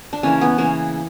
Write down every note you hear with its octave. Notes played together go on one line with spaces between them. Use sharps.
D4
C#3 E3 A#3 C#4
B3
C#3 E3 A#3 C#4